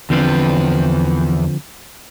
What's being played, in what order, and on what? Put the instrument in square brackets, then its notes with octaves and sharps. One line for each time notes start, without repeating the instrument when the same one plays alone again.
[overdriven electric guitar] E2 B4 [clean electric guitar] D3 F3 C4